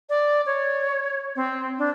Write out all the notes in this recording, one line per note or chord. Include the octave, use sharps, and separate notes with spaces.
D5
C#5
C4
D4